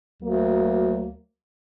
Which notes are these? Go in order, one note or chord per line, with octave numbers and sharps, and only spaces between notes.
D2 F#3 A#3